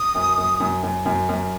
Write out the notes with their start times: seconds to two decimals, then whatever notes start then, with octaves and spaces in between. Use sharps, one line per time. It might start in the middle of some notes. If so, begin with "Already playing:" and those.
Already playing: D#6
0.15 F#2
0.38 F#2
0.60 F#2
0.83 F#2
1.06 F#2
1.29 F#2